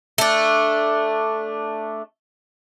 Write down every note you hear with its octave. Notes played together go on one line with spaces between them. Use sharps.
A3 D4